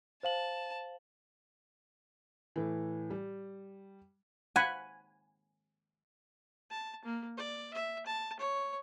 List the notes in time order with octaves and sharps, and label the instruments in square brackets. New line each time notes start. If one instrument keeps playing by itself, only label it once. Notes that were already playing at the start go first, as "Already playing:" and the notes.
[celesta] C5 F5 F#7 [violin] A5
[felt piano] A2 E3
G3
[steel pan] F#5 B5 [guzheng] G#5
[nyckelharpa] A5
A#3
D5
E5
A5
C#5